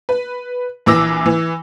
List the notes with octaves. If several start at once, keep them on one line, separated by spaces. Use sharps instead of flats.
B4
A#1 E3 D6 E6 A#6
E3